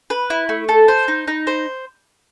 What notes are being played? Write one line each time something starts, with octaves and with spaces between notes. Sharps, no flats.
B4
E4
A3
A4
C5
D#4
D#4
C5